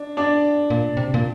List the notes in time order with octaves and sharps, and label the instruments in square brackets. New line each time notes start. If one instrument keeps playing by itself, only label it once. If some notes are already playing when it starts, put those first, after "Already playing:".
Already playing: [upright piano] D4
D4 D5
[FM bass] A#2
C3
A#2